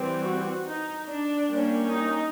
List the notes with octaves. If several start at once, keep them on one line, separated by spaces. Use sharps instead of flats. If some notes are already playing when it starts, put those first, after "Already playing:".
Already playing: E3 G3 C4
F#4
D#4
D4
G3 A#3 C#4
D#4